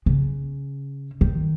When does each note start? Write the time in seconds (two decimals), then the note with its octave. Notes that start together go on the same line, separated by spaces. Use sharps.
0.06 C#3
1.21 D#3